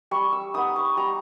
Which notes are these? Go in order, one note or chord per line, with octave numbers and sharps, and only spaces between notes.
G3 C#6
E6
B3 D#4 D#6
C#6
G3 A#5